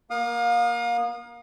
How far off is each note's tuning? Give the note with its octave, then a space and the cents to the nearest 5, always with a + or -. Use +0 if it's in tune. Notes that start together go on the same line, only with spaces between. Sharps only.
A#3 +20 F5 +30 D#6 -25